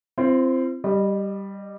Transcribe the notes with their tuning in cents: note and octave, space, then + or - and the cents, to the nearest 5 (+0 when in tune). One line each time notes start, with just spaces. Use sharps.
C4 +0 F4 -45
G3 +0 D#5 -25